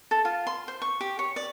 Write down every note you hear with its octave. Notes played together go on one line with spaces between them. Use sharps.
A4
F4
C6
C5
C#6
G4
C#5
D5